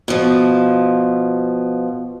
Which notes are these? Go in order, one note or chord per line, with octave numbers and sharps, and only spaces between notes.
B2 F3